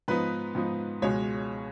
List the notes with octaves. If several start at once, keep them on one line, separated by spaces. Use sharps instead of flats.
G#2 F3 B3 D#4 B4
G#2 F3 B3 D#4
C#2 B2 G#3 C#4 C#5